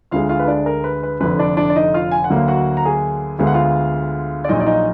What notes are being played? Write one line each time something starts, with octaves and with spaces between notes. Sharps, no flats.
D2 D3 G#3 F4 F5
F4 F5
B4
D4 D5
A#4
B4
B4
F1 F2 D3 B4
D4 D5
D4 D5
D5
D#4 D#5
F4 F5
G#5
F#5
D2 D3 F#3 A#3
F5
F#4 F#5
A#5
G#4 G#5
D2 D3 G#3 B3 F5
F#5
F4 F5
D5
A#1 A#2 F#3 D#4 D#5
D5
D#4 D#5